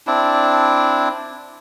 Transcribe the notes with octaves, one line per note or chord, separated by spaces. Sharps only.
C4 D4 E4